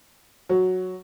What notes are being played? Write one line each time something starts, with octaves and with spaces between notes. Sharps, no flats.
F#3